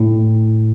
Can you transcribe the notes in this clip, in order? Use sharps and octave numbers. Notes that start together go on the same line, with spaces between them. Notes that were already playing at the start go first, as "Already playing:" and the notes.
Already playing: A2